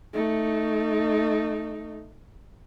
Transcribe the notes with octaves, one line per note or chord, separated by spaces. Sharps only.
A3 D#4